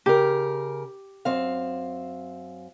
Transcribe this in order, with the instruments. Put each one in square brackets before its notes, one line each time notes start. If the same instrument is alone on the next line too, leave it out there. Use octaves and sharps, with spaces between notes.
[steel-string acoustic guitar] C#3 A#4 [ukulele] G4
[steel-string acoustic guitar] F#2 C4 F5